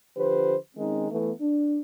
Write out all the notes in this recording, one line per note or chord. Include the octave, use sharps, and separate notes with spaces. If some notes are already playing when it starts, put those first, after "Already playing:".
D3 F3 G4 B4 C5
D#3 G#3 C4 C#4 D#4
E3 A3 B3
D4